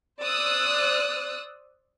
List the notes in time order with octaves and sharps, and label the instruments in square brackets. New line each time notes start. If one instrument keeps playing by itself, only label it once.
[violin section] C5 D5 D#6 E6 F#6